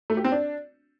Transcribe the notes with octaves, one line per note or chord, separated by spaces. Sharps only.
A3
G4
C4
D4